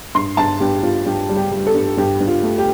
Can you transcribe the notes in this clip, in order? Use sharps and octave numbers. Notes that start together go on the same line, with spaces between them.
G2 C6
G2 A5
G2 G4
G2 F4
G2 G4
G3
G4
G3
A4
G2
G2 G4
G2
F4
A3
G4